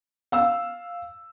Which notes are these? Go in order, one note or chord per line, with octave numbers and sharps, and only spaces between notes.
F5 E6